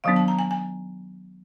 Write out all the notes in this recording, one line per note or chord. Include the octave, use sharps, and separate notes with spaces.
D#3 F#3 B3 D4 F5
A5
A#5
G#5
G#5